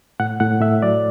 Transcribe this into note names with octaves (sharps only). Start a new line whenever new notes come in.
A2 F#5
A2 F#5
A2 E5
F#3 D5